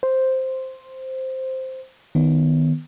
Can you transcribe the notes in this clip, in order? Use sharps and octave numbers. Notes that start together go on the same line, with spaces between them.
C5
D#3 B3